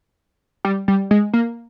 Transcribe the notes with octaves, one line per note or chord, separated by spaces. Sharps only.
G3
G3
G#3
A#3